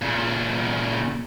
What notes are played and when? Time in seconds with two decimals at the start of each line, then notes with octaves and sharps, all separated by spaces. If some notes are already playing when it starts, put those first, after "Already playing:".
0.02 A#2 C#3